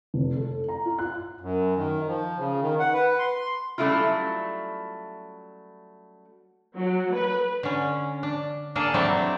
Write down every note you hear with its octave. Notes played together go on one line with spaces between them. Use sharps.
F1
A4
A#5
F4
F#6
F#2
D#3
F3
C#3
D#3
F#5
B4
C6
F#3 G3 A3 C#4 E4 F4
F#3
B4
D3 C#4
D4
A#3 D4 G#4 A4
F#3 G3 A3 C4 D4 E4
D4